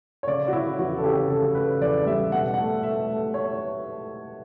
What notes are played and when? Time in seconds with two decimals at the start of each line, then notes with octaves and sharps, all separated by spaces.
0.23 C#5
0.27 C#3 D5
0.48 F#4
0.53 C#3 E4
0.79 E2 F#4
0.98 A4
1.04 C#3 G4
1.29 C#3 A4
1.55 C#3 B4
1.81 E2 D5
2.06 G3 E5
2.32 B2 F#5
2.54 A3 F#5
2.83 A3 E5
3.09 A3
3.34 A3 C#5